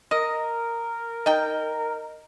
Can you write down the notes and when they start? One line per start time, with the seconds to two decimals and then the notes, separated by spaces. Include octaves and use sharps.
0.11 A#4 D#5 D#6
1.26 D#4 D#5 G5